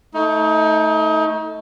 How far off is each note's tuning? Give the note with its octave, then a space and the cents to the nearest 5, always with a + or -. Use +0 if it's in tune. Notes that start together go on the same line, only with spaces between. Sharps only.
A3 +0 D#4 +30